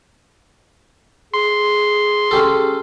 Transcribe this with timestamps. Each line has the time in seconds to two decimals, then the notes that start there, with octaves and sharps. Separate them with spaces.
1.34 G#4 C6
2.31 C#4 G4 A4